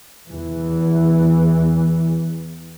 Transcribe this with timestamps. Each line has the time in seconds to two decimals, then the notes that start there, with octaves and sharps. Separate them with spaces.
0.30 E2 E3